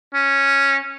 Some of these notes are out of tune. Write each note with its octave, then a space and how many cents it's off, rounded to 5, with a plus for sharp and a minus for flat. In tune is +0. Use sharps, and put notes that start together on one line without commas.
C#4 -5